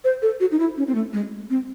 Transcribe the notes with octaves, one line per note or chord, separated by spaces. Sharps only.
C5
A4
F#4
D#4
E4
C#4
C4
A3
G#3
C4